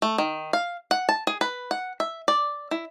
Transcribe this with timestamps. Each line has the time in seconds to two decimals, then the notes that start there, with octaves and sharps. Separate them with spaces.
0.02 A3
0.18 D#3
0.53 F5
0.91 F#5
1.09 A5
1.27 G#4
1.41 B4
1.71 F#5
2.00 E5
2.28 D5
2.71 E4